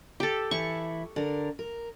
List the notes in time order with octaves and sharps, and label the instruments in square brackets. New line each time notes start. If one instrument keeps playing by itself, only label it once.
[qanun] G4 A4
[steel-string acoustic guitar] E3 E4 [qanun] C#6
[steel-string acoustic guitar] D3 A#4
A#4